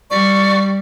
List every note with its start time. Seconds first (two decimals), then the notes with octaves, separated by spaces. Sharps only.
0.10 G3 D5 C#6